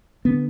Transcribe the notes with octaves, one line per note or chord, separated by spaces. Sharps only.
D3 B3